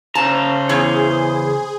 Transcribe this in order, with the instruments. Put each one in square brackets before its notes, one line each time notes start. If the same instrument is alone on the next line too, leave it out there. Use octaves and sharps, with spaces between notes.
[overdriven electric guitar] C#3 A#5 [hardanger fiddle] C5 [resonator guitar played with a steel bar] A5
[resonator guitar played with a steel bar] E2 E3 C#5 [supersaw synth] G#4